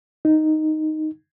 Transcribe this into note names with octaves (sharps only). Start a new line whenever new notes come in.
D#4